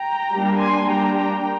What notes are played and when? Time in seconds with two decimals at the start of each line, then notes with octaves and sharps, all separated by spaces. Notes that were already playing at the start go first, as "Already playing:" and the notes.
Already playing: G5 A#5
0.32 G3 A#3 D4
0.61 G#5 C6
0.88 G3 A#3 D4 G5 A#5
1.17 G5 A#5